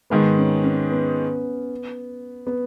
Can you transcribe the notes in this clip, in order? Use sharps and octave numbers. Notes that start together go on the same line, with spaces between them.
G#2 D#3 G#3 B3
C#4
C#4
B3
B3